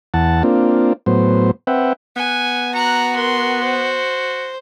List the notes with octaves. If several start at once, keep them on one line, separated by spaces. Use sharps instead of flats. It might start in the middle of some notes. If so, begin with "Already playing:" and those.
E2 F#5 A5
A#3 C4 D4 F4
A2 F#3 B3 C5
C4 B4 E5 F#5 G5
B3 F#5 G#5
F#4 A#5 F#6
A#4 C6
C5